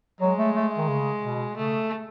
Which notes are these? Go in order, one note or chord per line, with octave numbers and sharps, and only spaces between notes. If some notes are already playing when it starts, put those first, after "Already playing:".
F#3 G#3
A3
A3
D#3
C#3
B2
C#3 A3